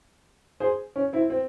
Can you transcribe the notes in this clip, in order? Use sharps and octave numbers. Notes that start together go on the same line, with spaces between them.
G#4 C5
C#4
C4 E4
C4